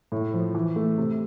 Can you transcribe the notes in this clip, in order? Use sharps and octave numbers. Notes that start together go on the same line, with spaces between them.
A2
F3
E3
A3
C3